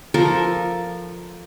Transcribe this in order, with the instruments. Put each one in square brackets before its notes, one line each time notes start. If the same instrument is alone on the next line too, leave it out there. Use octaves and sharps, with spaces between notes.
[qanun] F3 A4 A#4